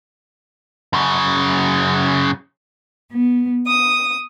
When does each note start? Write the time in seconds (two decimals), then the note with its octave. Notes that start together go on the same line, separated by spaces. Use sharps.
0.93 F#2 C#3
3.11 B3
3.66 D#6